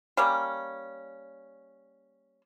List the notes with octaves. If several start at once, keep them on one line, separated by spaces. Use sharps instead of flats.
G3 A#3 C#4